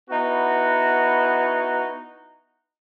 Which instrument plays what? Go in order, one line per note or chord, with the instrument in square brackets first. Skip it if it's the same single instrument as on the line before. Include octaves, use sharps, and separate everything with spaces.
[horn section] B3 D#4 E4 F#4